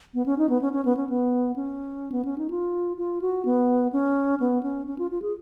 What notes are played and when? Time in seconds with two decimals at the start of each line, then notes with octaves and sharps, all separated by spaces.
0.14 B3
0.26 C#4
0.38 D#4
0.50 B3
0.62 C#4
0.73 C#4
0.85 B3
0.97 C#4
1.09 B3
1.56 C#4
2.12 B3
2.25 C#4
2.38 D#4
2.50 F4
2.98 F4
3.22 F#4
3.45 B3
3.93 C#4
4.40 B3
4.63 C#4
4.87 C#4
4.98 F4
5.11 F4
5.22 G#4